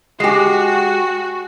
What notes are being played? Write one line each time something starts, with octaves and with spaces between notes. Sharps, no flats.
G#3 F#4 G4 G#5 C7